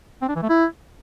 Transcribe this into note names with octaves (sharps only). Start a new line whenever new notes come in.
C4
D4
E3
A3
E4